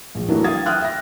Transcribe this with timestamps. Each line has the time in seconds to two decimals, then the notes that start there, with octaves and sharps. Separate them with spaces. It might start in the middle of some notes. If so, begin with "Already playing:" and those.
0.15 A#1
0.28 E3 F#3 A3 B3 D4 A#4
0.44 F5 G5 D#6 G#6 A6
0.66 E5 G5 D#6 F6 F#6
0.81 E5 A#6